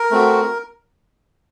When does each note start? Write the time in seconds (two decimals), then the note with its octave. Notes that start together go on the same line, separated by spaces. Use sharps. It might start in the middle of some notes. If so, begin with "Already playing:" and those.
Already playing: A#4
0.11 A3 C4 F#4